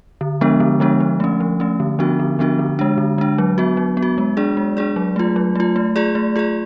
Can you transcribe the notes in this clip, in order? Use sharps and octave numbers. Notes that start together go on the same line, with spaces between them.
D3
F3 G#3 B3 D4
D3
F3 G#3 B3 D4
F3
A3 C#4
F3
A3 C#4
D3
F3 B3 D4 F#4
D3
F3 B3 D4 F#4
D3
G#3 D4
D3
G#3 D4
F#3
B3 F#4
F#3
B3
F#4
G#3
D4 G#4 D5
G#3
D4 G#4 D5
F#3
A3 F4
F#3
A3 F4
A3
F4 G#4 D5
A3
F4 G#4 D5